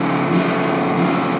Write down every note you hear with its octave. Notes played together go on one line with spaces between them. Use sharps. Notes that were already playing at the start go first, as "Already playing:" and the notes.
Already playing: C#3 F3 A3
F#2 C#3 F3 A3
F#2 C#3 F3 A3